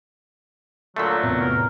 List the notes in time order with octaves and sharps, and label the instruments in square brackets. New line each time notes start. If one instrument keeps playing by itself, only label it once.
[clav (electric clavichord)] A#2 D3 A3 [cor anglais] F#3 [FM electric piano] C6 E6 B6
[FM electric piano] E2 C3 B3 [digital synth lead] A2
[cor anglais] A#4